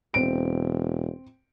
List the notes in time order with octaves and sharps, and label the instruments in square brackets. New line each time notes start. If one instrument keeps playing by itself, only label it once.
[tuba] E1 [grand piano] C4 D7